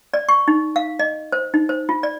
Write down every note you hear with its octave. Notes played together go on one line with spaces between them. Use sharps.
D5
C#6
D#4
F5
D#5
C5
D#4
C5
F4
D5